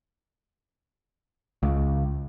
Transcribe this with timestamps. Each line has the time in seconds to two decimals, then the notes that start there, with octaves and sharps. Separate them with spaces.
1.63 C#2